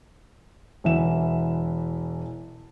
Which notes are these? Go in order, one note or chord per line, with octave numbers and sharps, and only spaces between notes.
E1 E3 E5 E7